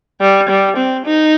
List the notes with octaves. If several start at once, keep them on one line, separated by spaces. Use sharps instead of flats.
G3
G3
C4
D#4